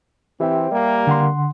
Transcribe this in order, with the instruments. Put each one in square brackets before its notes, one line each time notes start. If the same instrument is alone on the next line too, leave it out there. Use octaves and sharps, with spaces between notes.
[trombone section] E3 C4 [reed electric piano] G4 E5 G5
[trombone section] G3 A#3
[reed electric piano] D3 F#5 C6